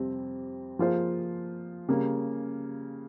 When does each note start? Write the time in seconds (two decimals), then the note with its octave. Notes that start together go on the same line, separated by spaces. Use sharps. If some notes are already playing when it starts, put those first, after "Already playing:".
Already playing: F2 C3 G3 C4
0.79 F3 A#3 F4 G#4 C5
1.89 C#3 G3 A#3